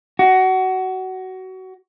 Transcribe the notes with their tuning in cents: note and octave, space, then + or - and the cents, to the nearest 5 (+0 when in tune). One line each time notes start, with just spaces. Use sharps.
F#4 +20